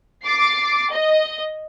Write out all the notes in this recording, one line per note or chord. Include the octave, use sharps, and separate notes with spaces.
D6 A6 C7
D#5